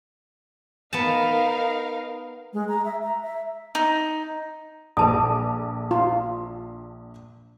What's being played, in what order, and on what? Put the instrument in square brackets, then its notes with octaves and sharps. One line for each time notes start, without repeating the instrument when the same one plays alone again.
[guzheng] B3 A5 [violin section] D#4 A#4 F5
[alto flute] G#3
A#5
E5
A#5
E5
[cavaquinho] D#4
[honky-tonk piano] A#1 A4 D6 [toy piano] B4 A5 D#6
[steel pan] F4